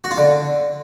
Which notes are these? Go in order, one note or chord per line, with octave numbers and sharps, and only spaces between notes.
F#4
F4
D3